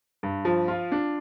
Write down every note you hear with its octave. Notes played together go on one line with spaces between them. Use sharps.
G2
F3
F4
D4